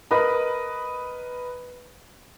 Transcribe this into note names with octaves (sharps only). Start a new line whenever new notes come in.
A#4 B4 D#5 B5